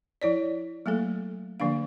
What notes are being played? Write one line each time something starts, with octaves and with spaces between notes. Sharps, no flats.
F3 E4 C#5 D5
F#3 A3 A#3 A4
D3 F3 A#3 D4 F5